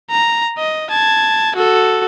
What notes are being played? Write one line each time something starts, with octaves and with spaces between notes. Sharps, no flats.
A#5
D#5
A5 G#6
F#4 A4